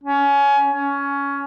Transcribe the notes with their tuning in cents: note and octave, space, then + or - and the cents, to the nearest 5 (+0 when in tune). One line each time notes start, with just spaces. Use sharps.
C#4 +20
C#4 +15